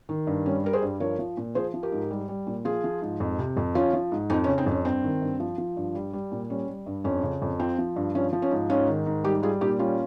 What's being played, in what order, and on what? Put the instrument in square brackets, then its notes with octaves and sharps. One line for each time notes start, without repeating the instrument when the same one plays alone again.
[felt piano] D#3
G2
G3 C#4
G3 A#4
G#4 C5
G2
F3 A#4 C#5
F3
A#2
F3 G#4 C5
F3
G4 A#4
G#2
G3
G3
A#2
F3 F4 G#4
F3
G#2
F2
C3
F2
F3 C#4 F4
F3
G#2
F2 C4 D#4
C#4
C#3
C4 D#4
F2 C#4
G2 C4
D#3
G2
F3
F3
G2
G3
G3
A#2
G3 C#4
G3
G2
F2 C#4
C#3
F2
F3 C4
F3
G2
F3 C#4
F3
C#4
G#2
G#2 C#4 F4
D#3
G#2
G3 D#4 G4
G3 F4 G#4
A#2 D#4 G4
G3 C#4 F4